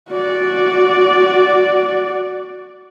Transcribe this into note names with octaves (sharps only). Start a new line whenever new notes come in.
F#4 D5